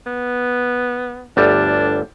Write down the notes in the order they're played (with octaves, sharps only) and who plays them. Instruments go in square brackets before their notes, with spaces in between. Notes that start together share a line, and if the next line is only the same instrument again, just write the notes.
[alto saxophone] B3
[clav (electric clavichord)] G1 D2 G3 [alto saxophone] D4